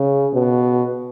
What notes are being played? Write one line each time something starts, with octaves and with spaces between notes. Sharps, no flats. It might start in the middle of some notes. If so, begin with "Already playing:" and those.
Already playing: C#3
B2